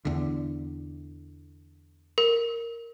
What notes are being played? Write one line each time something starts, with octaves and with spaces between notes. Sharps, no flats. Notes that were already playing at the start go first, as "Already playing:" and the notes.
E2 D3
A#4